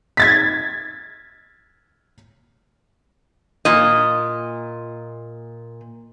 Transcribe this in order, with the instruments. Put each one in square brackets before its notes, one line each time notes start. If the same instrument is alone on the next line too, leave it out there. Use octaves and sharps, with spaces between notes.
[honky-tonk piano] G#6 A6 B6
[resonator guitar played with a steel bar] A#2 D#5